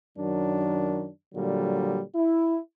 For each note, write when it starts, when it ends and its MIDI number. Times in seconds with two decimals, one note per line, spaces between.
0.17 1.09 42
0.17 1.09 51
0.17 1.09 54
0.17 1.09 62
1.35 2.01 46
1.35 2.01 50
1.35 2.01 54
1.35 2.01 55
2.15 2.58 64